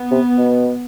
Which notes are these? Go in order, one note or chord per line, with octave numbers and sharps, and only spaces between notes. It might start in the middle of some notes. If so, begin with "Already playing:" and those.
Already playing: B3
C3
B2